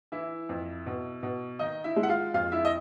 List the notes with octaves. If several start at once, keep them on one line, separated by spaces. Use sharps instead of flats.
E3 E4 E5
F2
B2
B2
D#3 D#4 D#5
E4 E5
G#3
F#5
F4 F5
F2 F4 F5
E4 E5
D#5